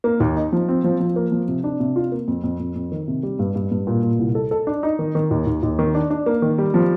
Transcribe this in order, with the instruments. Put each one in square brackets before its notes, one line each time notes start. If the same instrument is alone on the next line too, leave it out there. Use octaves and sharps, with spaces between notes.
[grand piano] A#3
D#2
D#4
F3
C4
F3
F3
A#3
F3
C3
D4
C3
F4
A#3
F2
F2
F2
F2
D#3
C3
G3
G2
G2
G2
A#2
A#2
C2
A4
A4
D4
D#4
D#3
D#3
D#2
D#2
D#2
D#3
D4
D4
A#3
D#3
G3
F3